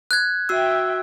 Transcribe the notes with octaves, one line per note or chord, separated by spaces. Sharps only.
F#6 G#6
F#4 E5 G5 E6